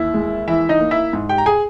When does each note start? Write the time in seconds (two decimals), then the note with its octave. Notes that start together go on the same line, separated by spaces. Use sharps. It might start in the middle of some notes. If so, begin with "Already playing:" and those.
Already playing: D#2 E3 E4 E5
0.14 G#3
0.47 E3 E4 E5
0.69 D#4 D#5
0.80 A#3
0.91 E4 E5
1.13 G#2
1.29 G4 G5
1.38 A#5
1.46 G#4 G#5